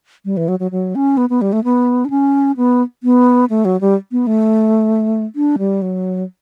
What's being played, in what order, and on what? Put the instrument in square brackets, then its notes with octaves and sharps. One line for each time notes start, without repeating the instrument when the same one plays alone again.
[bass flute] G3
E3
F#3
F#3
F#3
C#4
B3
B3
G3
A3
B3
D4
C#4
B3
B3
A3
F#3
G3
B3
A3
D4
G3
F#3